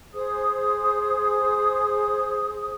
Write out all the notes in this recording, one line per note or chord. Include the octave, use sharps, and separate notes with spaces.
G#4 C5 D#6